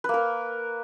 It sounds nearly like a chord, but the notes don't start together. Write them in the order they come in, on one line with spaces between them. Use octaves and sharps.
B4 A#3 A#4